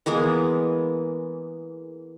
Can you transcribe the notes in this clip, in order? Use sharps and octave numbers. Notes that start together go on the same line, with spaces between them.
E3 G#3 A#3 B3